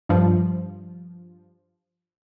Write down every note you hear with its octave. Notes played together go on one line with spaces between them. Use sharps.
G2 F3